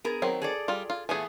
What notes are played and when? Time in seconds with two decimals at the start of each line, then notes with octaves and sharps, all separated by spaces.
0.04 B3 G#4 A#4
0.22 D#3 F#3 C4
0.42 G#4 A4 D5
0.68 G3 F4
0.90 F4
1.09 A#2 E3 A3 B3 G#4 G#5